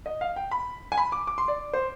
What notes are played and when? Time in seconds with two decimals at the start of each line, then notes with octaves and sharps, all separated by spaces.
0.06 D#5
0.21 F5
0.36 G5
0.51 B5
0.92 G#5
0.97 B5
1.12 D6
1.27 D6
1.38 C6
1.48 D5
1.73 C5